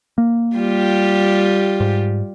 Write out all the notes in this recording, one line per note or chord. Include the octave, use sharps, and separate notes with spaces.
A#3
G3 F4 G4
G#2